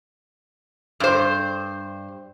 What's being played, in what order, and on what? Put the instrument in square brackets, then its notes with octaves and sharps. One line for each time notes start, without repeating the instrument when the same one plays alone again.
[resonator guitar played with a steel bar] G2 C5